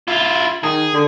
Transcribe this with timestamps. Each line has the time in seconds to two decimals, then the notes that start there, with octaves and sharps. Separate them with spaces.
0.08 E4 F4
0.64 D#3 G#4
0.94 D3